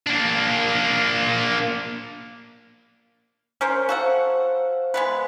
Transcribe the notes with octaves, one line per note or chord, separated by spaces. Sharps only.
A#3 D4
C#4 A#4 C5 F6
F#4 A4 C5 F5 F#5
G#3 B3 B4